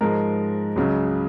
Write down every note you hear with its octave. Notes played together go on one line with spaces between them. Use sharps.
G#2 F3 G#3 A#4
C#2 C#3 F#3